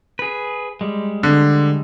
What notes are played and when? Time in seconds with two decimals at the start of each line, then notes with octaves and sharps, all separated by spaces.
0.19 G#4 B4
0.81 G3 G#3
1.23 D3